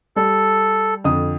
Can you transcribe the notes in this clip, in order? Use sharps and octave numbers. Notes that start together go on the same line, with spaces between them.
G3 A4
F2 D3 D#6